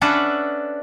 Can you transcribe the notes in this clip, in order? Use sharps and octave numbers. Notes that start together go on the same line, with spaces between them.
C#4 D4 A4 B4 E5 F#5